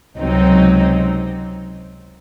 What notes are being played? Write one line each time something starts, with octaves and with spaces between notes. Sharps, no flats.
C#2 C3 F#3 C4 D#4